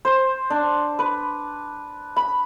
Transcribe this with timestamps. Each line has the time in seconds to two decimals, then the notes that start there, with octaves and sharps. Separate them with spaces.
0.05 C5
0.50 D4
0.99 B4
2.16 B5